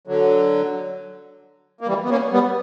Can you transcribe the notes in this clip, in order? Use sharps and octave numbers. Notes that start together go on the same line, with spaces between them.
D3 F#3
A#3
E3 G3
B3
A#3 C#4
G3 B3